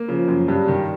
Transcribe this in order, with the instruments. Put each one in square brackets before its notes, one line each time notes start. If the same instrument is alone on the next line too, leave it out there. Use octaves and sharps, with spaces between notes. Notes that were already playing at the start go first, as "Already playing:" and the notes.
Already playing: [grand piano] A#3
[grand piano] C#3 [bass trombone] F3
[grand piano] F#2
[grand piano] G2 [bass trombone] G3
[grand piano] D#3